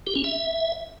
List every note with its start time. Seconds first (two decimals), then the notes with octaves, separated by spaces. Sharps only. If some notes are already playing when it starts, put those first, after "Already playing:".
0.07 G4
0.15 C#4
0.24 E5